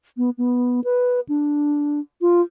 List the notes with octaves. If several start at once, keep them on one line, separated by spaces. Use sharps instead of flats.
B3
B3
B4
D4
F4